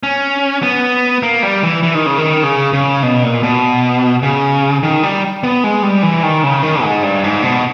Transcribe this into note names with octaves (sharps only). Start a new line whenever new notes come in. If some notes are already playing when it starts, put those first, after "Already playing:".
C#4
B3
A#3
G3
E3
E3
D#3
C#3
D#3
C#3
C#3
B2
A#2
B2
C#3
D#3
G3
B3
G#3
G3
E3
D#3
C#3
D#3
G#2
G2
G#2
B2